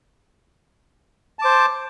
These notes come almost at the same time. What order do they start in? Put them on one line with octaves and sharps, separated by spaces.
A5 D6 C5